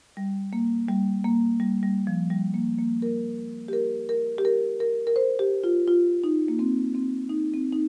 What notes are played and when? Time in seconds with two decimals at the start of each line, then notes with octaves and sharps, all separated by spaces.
0.17 G3
0.53 A#3
0.88 G3
1.24 A#3
1.60 G3
1.83 G3
2.07 F3
2.31 G3
2.54 A#3
2.79 A#3
3.02 A#4
3.68 G4
3.73 A#4
4.09 A#4
4.38 G4
4.45 A#4
4.80 A#4
5.07 A#4
5.16 C5
5.39 G4
5.64 F4
5.88 F4
6.24 D#4
6.48 A#3
6.59 C4
6.95 C4
7.29 D#4
7.54 C4
7.73 D#4